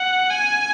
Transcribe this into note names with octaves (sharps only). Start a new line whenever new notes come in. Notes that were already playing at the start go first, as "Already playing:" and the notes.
Already playing: F#5
G#5